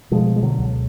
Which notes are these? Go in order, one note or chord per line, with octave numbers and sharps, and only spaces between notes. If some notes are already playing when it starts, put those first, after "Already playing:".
B2 F3 G#3
G#3
D3 F#3
C#2